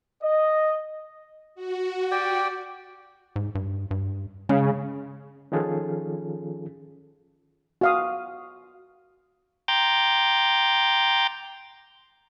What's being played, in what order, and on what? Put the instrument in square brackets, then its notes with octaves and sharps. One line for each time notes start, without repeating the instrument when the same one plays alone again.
[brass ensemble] D#5
[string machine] F#4
[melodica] G4 D5 G5
[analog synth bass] G#2
G2
G2
[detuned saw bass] C#3 [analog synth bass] G#3
[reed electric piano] D#3 F3 C#4 F4 G#4 A4
[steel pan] F#4 F5 D#6
[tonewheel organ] G5 A#5 C6 D6 G6 A6